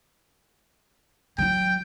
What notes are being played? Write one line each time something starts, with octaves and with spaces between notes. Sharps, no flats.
F#3 F4 G5